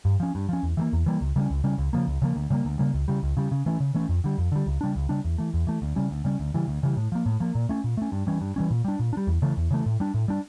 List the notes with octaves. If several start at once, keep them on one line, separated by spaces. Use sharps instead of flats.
G2
F3 C#4
G2
F3 C#4
E2
E3 G3 A#3
E2
E3 G3 A#3
C#2
C#3 G3 C#4
C#2
C#3 G3 C#4
C#2
C#3 F3 A#3
C#2
C#3 F3 A#3
D2
C#3 G3 A#3
D2
C#3 G3 A#3
C#2
C#3 G3
C#2
C#3 G3
C#3
E3 A3 C#4
C#3
E3 A3 C#4
F2
D3 G3
F2
D3 G3
C#2
C#3 G3 D4
C#2
C#3 G3 D4
E2
E3 A3
E2
E3 A3
D2
C#3 G3 C#4
D2
C#3 G3 C#4
D2
C#3 E3 G3
D2
C#3 E3 G3
A2
F3 A#3
A2
F3 A#3
A#2
A3 C#4
A#2
A3 C#4
G2
E3 G3 C#4
G2
E3 G3 C#4
A#2
G3 D4
A#2
D4
G3
E2
C#3 E3 A3
E2
C#3 E3 A3
A2
G3 D4
A2
G3 D4